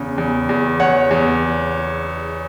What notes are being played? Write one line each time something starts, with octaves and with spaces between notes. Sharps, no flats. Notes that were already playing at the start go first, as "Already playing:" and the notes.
Already playing: E2 C#3
E2
E2
E2 C#5 F#5
E2